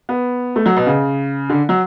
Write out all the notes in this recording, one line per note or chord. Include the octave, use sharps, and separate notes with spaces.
B3
A3
F#3
B2
C#3
D3
F#3